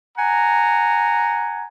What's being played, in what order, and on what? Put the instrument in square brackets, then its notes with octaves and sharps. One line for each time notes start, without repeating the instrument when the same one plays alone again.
[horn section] F#5 G#5 A#5